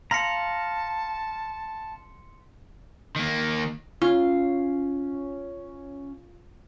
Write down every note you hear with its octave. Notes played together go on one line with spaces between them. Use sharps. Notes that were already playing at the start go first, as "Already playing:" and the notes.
F5 A5 A#5 C6 B6 C#7
D#3 A#3
C#4 F4